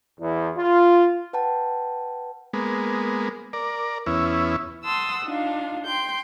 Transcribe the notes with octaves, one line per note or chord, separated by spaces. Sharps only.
E2
F4
B4 F#5 G5 A5
G#3 A#3 B3
A#4 D5
E2 B3 C#4 E4
F#5 A5 C6 D#6 E6
D4 D#4 F4 F5
G5 C6 G6